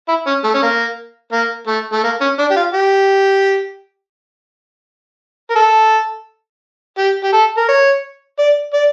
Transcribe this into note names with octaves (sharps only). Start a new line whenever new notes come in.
E4
C#4
A3
C#4
A#3
A#3
A3
A3
A#3
C#4
D4
G4
F4
G4
A#4
A4
G4
G4
A4
A#4
C#5
D5
D5